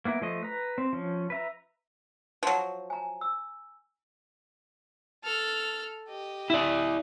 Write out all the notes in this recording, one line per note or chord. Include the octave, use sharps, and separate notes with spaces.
A#3 B3 E4 A#4
F3 A3 D#5
B4 A#5
C4
F3 C#4
B4 E5 A#5
F3 F#3
G#5 A#5
E6
A4 F6
G4 D#5
E4 D5